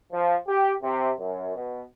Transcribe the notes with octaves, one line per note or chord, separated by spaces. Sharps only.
F3
G4
C3
F#2
B2